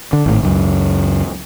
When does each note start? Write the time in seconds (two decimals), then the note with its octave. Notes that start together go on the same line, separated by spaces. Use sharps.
0.13 D3
0.26 G#1 A2
0.42 C#2 F#2